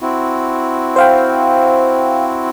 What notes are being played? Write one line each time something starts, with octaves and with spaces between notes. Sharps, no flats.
C4 E4 F#4
C5 F5 G5